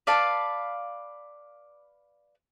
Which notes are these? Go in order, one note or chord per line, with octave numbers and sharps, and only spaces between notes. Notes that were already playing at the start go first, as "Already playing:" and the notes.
B4 D5 F5 A5